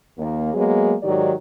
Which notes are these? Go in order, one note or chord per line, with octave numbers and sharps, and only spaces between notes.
D#2 A#3
F#3 G#3 A#3 B3 G#4
G#2 D#3 F#3 G4 D5